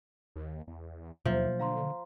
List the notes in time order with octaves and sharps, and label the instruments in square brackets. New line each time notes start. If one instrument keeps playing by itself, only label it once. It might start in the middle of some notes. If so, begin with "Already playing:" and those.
[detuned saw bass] D#2
E2
[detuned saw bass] D#2 [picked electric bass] B2 F#3 A#3 [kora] F3 [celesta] E5
[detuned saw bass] D3 [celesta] F5 A#5 C6